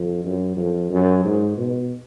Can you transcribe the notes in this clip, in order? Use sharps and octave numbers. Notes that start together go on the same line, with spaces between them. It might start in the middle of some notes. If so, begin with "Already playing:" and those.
Already playing: F2
F#2
F2
F#2
G#2
B2